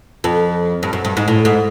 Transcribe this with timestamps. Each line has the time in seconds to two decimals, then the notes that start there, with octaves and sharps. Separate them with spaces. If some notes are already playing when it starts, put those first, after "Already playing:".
0.24 F2
0.83 G2
0.93 F#2
1.05 G2
1.17 G#2
1.28 A2
1.45 G#2